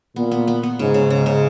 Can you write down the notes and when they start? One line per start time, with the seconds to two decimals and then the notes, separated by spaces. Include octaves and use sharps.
0.16 A#2 B3
0.31 B3
0.48 B3
0.63 B3
0.79 G#2 C#3
0.94 C#3
1.10 C#3
1.26 C#3